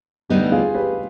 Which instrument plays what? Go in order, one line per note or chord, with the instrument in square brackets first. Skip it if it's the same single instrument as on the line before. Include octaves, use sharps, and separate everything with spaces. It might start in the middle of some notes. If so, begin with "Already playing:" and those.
[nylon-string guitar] D2 C3 G3 B3 D#4 [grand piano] G4 B4
[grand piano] F4 G#4
G4 B4